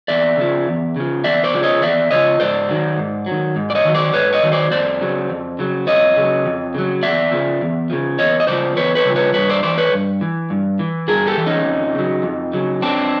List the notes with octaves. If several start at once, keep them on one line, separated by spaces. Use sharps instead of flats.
E2 D5 E5
C#3 F3
E2
C#3 F3
E2 D5 E5
C5 D5
C#3 F3
C#5 D#5
E2 D5 E5
C#3 F3 C#5 D#5
G#2 C5 D5
D#3 F#3
G#2
F#3
D#3
G#2
D5
C#5 D#5
D#3 F#3
C5 D5
G#2 B4 C#5
C#5 D#5
D#3 F#3
C5 D5
F2 C5 D5
C#3 F#3
F2
C#3 F#3
F2 C#5 D#5
C#3 F#3
F2
C#3 F#3
E2 D5 E5
C#3 F3
E2
C#3 F3
E2 C#5 D#5
D#5
C#3 F3 C5 D5
E2 B4 C#5
B4 C#5
C#3 F3
B4 C#5
G2 B4 C#5
C5 D5
E3 C5 D5
B4 C#5
G2
E3
G2
E3
G2 G#4 A#4
G4 A4
E3
C#4 D#4
F2
C#3 F#3
F2
C#3 F#3
F2 C4 D4